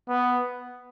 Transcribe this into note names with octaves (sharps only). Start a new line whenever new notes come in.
B3